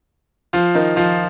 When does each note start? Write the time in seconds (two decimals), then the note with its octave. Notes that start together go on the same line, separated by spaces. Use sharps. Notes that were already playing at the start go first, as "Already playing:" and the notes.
0.53 F3 F4
0.75 D#3 D#4
0.96 F3 F4